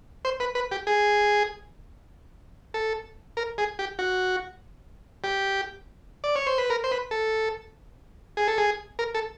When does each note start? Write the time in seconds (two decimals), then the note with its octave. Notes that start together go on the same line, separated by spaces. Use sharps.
0.25 C5
0.40 B4
0.55 B4
0.71 G4
0.87 G#4
2.74 A4
3.37 A#4
3.58 G#4
3.79 G4
3.99 F#4
5.24 G4
6.24 D5
6.36 C#5
6.47 C5
6.58 B4
6.70 A#4
6.84 C5
6.91 B4
7.11 A4
8.37 G#4
8.48 A4
8.58 G#4
8.99 A#4
9.15 A4